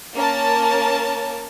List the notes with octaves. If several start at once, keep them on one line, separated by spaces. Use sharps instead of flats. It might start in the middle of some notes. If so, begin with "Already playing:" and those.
A#3 C#4 A#4 A5